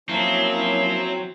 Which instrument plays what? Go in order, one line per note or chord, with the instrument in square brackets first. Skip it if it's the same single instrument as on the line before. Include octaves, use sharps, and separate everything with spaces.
[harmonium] F3 A#3 C#4 [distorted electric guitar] F#3 [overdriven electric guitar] C4 [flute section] E4 C#5 E5